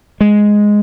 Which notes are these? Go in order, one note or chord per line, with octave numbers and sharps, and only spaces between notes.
G#3